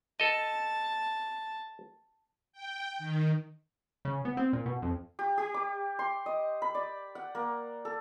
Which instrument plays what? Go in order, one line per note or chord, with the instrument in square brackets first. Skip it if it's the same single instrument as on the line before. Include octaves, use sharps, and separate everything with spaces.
[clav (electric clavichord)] A4 D#5 [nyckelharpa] A5
[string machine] G5
D#3
[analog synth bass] C#3
B3
C4
A#2
B2
F2
[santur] G4
G4
D6
C6
D#5
B5
D5
F#5
A#3
A4